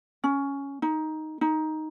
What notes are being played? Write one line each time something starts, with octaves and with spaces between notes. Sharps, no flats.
C#4
D#4
D#4